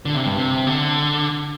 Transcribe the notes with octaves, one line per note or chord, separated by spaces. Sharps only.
D3
C3
G2
C3
D3